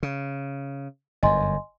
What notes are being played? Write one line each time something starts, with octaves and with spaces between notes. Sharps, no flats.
C#3
G1 F#2 D#5 G#5 C6